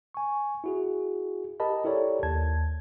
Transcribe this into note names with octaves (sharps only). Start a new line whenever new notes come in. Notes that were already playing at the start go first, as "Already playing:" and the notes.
G#5 C#6
E4 F#4 G#4
G4 A#4 D#5 A5 B5
E4 G4 A4 A#4 C#5 D5
D#2 A5 G#6